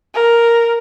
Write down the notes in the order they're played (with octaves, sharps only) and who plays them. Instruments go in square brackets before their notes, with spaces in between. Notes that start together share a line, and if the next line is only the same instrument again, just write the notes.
[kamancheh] A#4